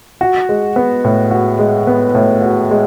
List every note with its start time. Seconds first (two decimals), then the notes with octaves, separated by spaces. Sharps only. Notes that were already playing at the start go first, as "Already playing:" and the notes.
0.21 F#4
0.49 G#3
0.76 B3
1.04 A2
1.31 F#4
1.59 G#3
1.87 B3
2.15 A2
2.42 F#4
2.71 G#3